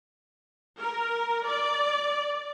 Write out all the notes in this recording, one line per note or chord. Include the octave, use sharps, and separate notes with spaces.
A#4
D5